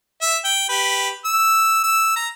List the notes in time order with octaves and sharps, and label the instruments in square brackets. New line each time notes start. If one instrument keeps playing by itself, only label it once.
[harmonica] E5
G5
G4 B4
E6
E6
A#5